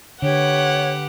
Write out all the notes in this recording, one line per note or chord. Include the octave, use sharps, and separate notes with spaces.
D3 G4 B4 C#5 F#5